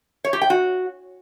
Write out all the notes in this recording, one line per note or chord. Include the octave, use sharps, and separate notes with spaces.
C#5
G4
G5
F#4